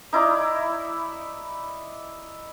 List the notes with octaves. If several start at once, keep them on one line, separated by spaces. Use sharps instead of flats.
D#4 E4 D5 A#5